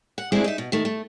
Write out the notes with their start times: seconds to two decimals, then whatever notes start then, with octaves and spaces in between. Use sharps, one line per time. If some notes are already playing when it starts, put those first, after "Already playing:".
0.18 F#5
0.32 G#3 A3 C4 D4 E4 G#4
0.44 D#4 E5
0.58 B2
0.72 D#3 A3
0.85 A3